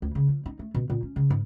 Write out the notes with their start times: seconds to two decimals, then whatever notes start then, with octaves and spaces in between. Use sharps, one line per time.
0.02 D2
0.15 C#3
0.28 F3
0.46 D#4
0.59 A3
0.75 B2
0.90 A#2
1.03 C#4
1.16 C#3
1.30 G#2